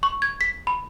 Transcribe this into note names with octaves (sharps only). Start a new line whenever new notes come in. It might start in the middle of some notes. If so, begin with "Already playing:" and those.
C#6
G#6
B6
B5